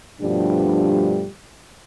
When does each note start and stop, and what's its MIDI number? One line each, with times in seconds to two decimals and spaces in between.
0.21 1.27 43
0.21 1.27 47
0.21 1.27 53
0.21 1.27 55
0.21 1.27 57
0.21 1.27 62